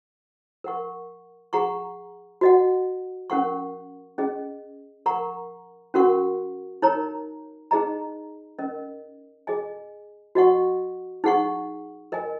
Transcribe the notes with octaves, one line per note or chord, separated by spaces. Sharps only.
A#4 F#5 C#6
G#4 F#5 A#5 C#6
F#4 D#5 F#5
C#4 A#4 F#5 C#6
C#4 G#4 D#5
A#4 F#5 A#5 C#6
C#4 F#4 A#4 F#5 C#6
D#4 A#4 C#5 A#5
D#4 G#4 D#5 A#5
C#4 A#4 D#5
G#4 D#5 G#5
F#4 D#5 F#5 C#6
D#4 G#4 F#5 C#6
A#4 D#5 G#5